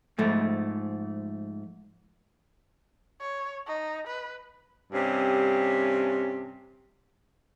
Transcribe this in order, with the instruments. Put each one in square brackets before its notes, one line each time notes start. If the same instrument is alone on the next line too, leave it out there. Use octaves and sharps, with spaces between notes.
[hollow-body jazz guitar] G#2 F3 A3
[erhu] C#5
D#4
B4
[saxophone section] G2 C3 C#4